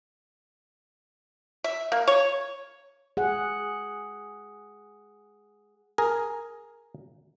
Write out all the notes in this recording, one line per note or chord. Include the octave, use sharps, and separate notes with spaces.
E5
A#3
C#5
G#4 F#5
G#4 A#4 G#5